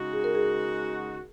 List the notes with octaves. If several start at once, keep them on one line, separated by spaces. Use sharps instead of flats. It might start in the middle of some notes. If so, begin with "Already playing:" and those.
Already playing: C#3 G#3 D#4 F#4
G#4
A#4
G#4